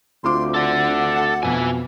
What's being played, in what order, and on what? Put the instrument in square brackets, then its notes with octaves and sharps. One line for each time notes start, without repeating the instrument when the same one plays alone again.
[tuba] D2 [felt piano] C4 F4 D6 [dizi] C6
[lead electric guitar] A4 D5 [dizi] F#5
[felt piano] F2 B2 [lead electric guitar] E4 G#5